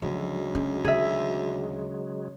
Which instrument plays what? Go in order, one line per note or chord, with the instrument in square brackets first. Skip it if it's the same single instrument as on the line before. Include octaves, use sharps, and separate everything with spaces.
[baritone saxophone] D2 [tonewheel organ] C#3 F#3 G#3 [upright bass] F3
[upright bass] C#4
[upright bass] D#3 [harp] G#4 E5